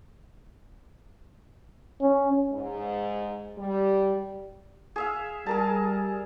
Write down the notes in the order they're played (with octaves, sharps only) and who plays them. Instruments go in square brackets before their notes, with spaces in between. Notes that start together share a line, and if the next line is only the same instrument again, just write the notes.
[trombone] C#4
[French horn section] G#2
G3
[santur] G#4 E5 F5
[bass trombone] G3 [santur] G#4 A#4 A5